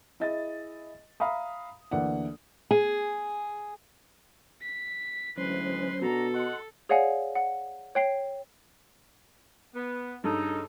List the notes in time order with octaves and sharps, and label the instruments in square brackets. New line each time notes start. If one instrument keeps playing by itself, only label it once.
[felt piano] E4 G#4 D#5 A6
E5 F5 A#5 B5 D#6
D2 E3 A#3 D5 F#5
[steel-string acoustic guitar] G#4
[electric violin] B6
[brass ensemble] D2 E3 G#3 [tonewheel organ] F#3 C#4 C5 [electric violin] B4 C6
[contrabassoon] B2 [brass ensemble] D4 F#4 A#5 [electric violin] A4
[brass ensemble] F#4 D#5 F#5 [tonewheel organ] C6
[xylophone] G#4 C#5 D5 F5 F#5 G#5
F#5
C#5 G5 C7
[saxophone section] B3
[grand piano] G2 [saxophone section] C#3 A4 [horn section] D#4